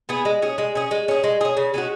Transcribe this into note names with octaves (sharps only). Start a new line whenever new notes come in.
B3 G#4
G#3
C#4 G#4
G#3
C#4 G#4
G#3
C#4 G#4
G#3
C#4 G#4
C#3
G#3 C#4 F#4